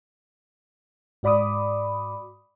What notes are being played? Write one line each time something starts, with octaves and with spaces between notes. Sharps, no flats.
G#2 F#4 D5 B5 D6 D#6